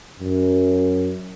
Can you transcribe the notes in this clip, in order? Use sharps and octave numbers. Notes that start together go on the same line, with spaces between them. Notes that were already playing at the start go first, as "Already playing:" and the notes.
F#2